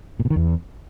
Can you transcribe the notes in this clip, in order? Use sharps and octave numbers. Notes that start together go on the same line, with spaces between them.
A#2
B2
D#3
E2